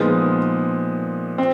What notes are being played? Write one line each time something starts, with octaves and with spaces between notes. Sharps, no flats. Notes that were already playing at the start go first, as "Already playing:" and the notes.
Already playing: A#2 F3 G#3 B3 D#4
C4